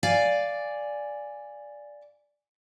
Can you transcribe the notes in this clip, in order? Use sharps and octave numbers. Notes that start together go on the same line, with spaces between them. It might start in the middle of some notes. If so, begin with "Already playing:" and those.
D5 F5 G#5